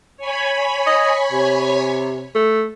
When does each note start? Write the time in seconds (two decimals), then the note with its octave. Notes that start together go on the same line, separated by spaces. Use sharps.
0.17 C#5 G#5 B5
0.87 D#5
1.32 C3
2.35 A3